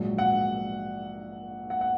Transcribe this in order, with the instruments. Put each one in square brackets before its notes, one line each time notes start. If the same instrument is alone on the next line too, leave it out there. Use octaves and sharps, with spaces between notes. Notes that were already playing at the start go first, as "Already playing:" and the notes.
Already playing: [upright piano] A#1 G#2 F#3
F#5
F#5
F#5